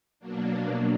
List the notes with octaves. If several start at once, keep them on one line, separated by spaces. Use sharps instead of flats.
B2 F#3 A#3 D4